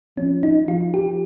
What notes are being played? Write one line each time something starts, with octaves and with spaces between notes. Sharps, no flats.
F3 C#4
D#4
F3 F4
G4